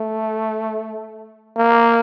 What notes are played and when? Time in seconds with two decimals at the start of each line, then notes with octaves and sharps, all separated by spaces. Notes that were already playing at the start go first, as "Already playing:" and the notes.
Already playing: A3
1.57 A#3